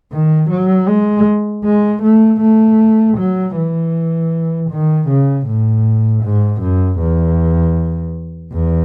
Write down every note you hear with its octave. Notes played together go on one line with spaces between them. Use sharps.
D#3
F#3
G#3
G#3
A3
A3
F#3
E3
D#3
C#3
A2
G#2
F#2
E2
E2